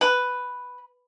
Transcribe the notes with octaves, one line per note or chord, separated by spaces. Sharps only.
B4